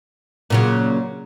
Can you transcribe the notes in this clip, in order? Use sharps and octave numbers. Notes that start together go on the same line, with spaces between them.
A#2 C#3 F#3